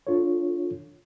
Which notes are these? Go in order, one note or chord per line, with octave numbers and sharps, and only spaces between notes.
D4 F4 A4 C#5